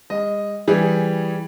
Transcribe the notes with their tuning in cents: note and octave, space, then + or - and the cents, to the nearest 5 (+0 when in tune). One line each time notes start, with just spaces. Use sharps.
G#3 -45 D#5 -5
E3 +0 G3 +0 G#4 +0